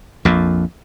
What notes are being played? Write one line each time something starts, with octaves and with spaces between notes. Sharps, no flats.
A#1 F2 A#2